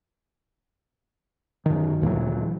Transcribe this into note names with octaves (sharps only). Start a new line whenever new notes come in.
F#2 D#3
D2 A#2 E3 F#3